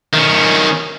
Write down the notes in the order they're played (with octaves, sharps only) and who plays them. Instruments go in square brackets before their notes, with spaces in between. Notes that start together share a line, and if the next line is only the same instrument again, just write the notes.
[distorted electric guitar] D#3 C#4